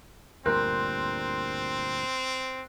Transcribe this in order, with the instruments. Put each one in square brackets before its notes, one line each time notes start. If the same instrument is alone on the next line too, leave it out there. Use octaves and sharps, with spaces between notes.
[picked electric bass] D2 G2 A#2 [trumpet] C4 [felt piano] A#4 [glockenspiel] C6 F#6 G6